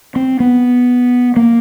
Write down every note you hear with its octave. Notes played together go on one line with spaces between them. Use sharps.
C4
B3
A#3